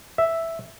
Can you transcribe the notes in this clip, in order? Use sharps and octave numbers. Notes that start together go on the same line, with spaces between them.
E5